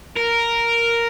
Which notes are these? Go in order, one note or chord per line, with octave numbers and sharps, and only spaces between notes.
A#4